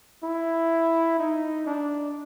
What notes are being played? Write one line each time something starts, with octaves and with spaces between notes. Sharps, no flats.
E4
D#4
D4